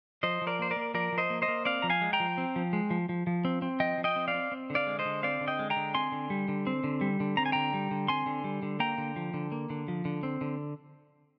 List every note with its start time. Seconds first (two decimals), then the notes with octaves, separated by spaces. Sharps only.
0.23 F3 C5 D#5
0.42 F3
0.47 A#4 D5
0.59 A#3 C5
0.71 A#4 D5
0.76 A#3
0.94 F3 A#4 D5
1.12 F3
1.18 C5 D#5
1.30 A#3
1.42 C5 D#5
1.48 A#3
1.65 C4 D5 F5
1.82 F3 A#5
1.90 F5 G#5
2.01 G#3
2.13 G5 A#5
2.20 F3
2.38 C4
2.56 F3
2.73 G#3
2.90 F3
3.09 F3
3.27 F3
3.45 C4
3.62 C4
3.80 F3 D#5 G5
3.98 F3
4.04 D#5 G5
4.16 C4
4.28 D5 F5
4.34 C4
4.52 C4
4.70 D3
4.75 D5 F5
4.87 G#3
4.99 C5 D#5
5.05 D3
5.23 C4 D5 F5
5.41 D3
5.47 D#5 G5
5.59 G#3
5.70 G5 A#5
5.76 D3
5.95 C4 G#5 C6
6.12 D3
6.30 G3
6.48 D3
6.67 C4
6.84 D3
7.01 G3
7.20 D3
7.37 C4 A#5
7.46 G#5
7.52 D3 G5 A#5
7.74 G3
7.91 D3
8.08 C4 G#5 C6
8.26 D3
8.44 G3
8.63 D3
8.80 A#3 G5 A#5
8.98 D3
9.16 F3
9.34 D3
9.52 A#3
9.70 D3
9.88 F3
10.05 D3
10.23 C4
10.41 D3